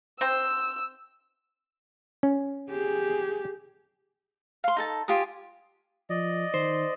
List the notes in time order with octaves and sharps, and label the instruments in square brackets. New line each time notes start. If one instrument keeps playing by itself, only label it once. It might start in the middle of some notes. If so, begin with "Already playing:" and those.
[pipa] C4 C5 [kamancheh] E6
[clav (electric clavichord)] C#4
[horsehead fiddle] G4 G#4
[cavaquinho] F5 C6
D#4 A4 A5
F4 G4 G#5 D#6
[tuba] F3 [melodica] D5 D#5
[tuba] D#3 [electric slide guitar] C5